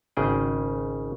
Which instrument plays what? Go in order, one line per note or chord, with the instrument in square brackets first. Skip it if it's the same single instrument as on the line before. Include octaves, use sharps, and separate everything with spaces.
[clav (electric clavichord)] G#1 C#3 G#4 G5